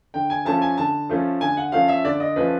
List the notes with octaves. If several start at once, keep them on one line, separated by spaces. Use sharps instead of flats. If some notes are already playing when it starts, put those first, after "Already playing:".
D3 G5
G#5
F3 A3 C#4 A5
G#5
D3 A5
F3 A3 C#4
D3 G#5
F#5
F3 A3 C#4 F5
E5
D3 D5
D#5
F3 A3 C#4 B4